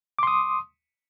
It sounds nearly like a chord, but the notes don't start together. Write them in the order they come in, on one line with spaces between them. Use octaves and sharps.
D6 C6 D#6